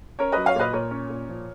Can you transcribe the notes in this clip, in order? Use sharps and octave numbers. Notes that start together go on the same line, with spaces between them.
C#4 A#4 C#5
F#3 B4 D#5
C#5 F5
A#2 B4 D#5
A#2 A#4 C#5
C#4
A#2
F3